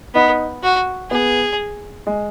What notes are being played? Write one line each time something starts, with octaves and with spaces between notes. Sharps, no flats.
B3 D#4
F#4
B3 G#4
G#3